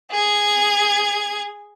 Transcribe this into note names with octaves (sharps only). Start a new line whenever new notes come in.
G#4 G#6